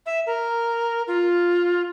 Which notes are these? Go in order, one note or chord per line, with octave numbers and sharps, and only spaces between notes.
E5
A#4
F4